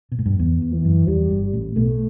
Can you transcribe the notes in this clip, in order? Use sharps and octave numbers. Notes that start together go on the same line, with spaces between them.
B2
A2
G2
F#2
E2 B3
E2
E3
F#2
E2 G3
G1 G2
A1 A2
B1 B2 A3